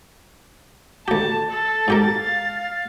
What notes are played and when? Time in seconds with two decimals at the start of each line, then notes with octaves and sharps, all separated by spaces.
1.08 D2 G4 A5
1.51 A4 A6
1.88 G#2 G4 A#4
2.19 F5